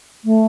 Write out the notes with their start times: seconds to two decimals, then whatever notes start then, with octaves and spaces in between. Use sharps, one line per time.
0.25 A3